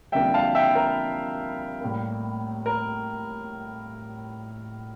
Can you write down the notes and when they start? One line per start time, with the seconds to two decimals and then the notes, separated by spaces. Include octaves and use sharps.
0.12 F2 D3 G3 A#3 E5 G5
0.34 F5 A5
0.55 E5 G5
0.75 A#4
1.81 A2 G3 A#3
2.66 A#4